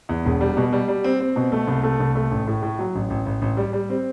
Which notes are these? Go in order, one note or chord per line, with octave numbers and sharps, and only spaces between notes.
E2
E1
G3
B2
G3
G3
C4
C4
B2
A3
C2
A3
C2
A3
A1
A2
A2
F#3
A1
A1
A1
A1
G3
G3
C4